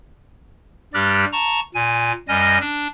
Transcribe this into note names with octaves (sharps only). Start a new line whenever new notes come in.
G2 G3 G4 D5 F6 F#6
A5 A#5 C#6
A#2 G#5
F#2 G3 D#5 G#5 F6 A#6
D4